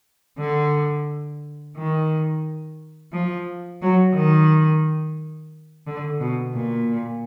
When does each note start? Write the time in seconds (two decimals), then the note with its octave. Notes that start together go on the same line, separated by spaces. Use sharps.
0.41 D3
1.77 D#3
3.13 F3
3.82 F#3
4.16 D#3
5.87 D3
6.21 B2
6.56 A#2